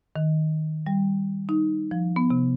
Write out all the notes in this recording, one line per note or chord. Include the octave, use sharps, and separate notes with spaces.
D#3
G3
D#4
F3
B3
C3